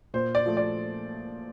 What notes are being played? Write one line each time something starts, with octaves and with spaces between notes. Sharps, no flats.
A#2 C5
D5
F3 A3
D5